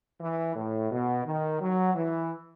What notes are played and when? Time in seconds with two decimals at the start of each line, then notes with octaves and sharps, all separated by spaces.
0.20 E3
0.55 A2
0.91 B2
1.25 D#3
1.60 F#3
1.95 E3